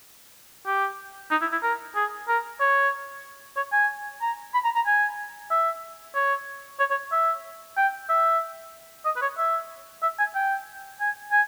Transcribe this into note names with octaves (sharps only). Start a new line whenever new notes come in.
G4
D#4
E4
E4
A#4
G#4
A#4
C#5
C#5
G#5
A#5
B5
A#5
A#5
G#5
E5
C#5
C#5
C#5
E5
G5
E5
D#5
B4
C#5
E5
E5
G#5
G5
G#5
G#5